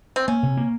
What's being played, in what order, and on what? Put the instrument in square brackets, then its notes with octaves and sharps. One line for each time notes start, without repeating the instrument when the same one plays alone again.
[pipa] C4
[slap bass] A#3 [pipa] C#4
[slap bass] C3
A#3